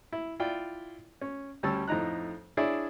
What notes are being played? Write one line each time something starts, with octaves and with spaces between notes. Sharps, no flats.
E4
E4 F4 D5 G5
C#4
D2 G3 C#4 A5 E6
F2 A2 D#4 A#5 F#6
D4 E4 G#4 C#5 D5